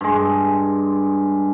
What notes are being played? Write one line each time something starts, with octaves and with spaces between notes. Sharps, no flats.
G2 G#3